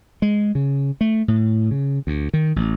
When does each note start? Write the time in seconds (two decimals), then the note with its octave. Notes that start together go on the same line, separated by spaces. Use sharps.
0.22 G#3
0.55 C#3
1.01 A3
1.28 A2
1.71 C#3
2.07 D2
2.34 D#3
2.56 A1